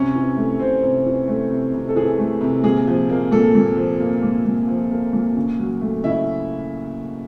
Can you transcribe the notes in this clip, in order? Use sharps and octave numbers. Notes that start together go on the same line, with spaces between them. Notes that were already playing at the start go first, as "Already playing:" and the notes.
Already playing: C3 C#4 C#5
E3
A3
C3 C4 C5
C3
E3
A3
C3
C3
A4
E3 G#4
A3
C3
A#2 G#4
F3
A#3
A#2 A4
A#2
F3
A#3
A#2
A#2
F3
A#3
A#2
C#3
F#3
A3
C#3 E4 E5